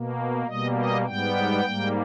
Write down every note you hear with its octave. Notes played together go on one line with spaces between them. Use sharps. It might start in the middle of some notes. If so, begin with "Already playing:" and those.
Already playing: B2 A#3
B2 G3 A#3 D#5
D#5
G#2 G3 B3 G5
G#2 G3 A#3